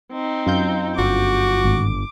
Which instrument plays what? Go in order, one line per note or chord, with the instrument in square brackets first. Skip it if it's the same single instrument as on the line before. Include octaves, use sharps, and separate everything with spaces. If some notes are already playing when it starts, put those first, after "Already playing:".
[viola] C4 D#4
[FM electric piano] F#2 F4 G6
[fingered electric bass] G1 [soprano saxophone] F#4 [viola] D6
[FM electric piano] G#1